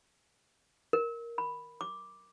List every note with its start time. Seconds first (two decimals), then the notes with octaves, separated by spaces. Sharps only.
0.93 A#4
1.38 B5
1.81 D6